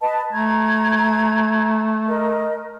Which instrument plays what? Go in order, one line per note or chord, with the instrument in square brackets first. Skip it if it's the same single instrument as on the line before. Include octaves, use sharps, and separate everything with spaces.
[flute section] B4 D#5 A5
[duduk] A3 [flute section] A#5 G#6
[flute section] A#4 D#5